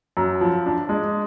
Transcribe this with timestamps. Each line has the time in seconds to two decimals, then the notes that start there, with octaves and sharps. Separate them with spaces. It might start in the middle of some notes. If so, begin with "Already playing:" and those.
0.17 F#2
0.41 F3
0.66 D4
0.89 G#3